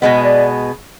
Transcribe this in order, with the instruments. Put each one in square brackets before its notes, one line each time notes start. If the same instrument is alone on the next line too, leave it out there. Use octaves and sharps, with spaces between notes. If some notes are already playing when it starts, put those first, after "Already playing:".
[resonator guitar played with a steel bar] B2 G#3 B3 [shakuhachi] D#5
[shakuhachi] D5